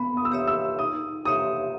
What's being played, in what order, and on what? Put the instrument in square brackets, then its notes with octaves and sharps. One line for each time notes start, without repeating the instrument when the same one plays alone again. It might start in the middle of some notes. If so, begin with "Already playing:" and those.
Already playing: [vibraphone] B3 [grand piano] B5
[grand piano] D#6
E6
[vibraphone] G4 C#5 E5 [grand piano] D#6
[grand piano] E6
[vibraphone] D#4 [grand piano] D#6
[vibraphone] G4 C#5 E5 [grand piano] D#6